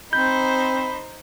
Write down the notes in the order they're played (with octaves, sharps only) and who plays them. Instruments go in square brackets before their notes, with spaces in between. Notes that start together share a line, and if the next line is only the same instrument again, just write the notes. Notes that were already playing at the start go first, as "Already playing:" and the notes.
[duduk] C4 [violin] D#4 C5 [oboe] B5 [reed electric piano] G6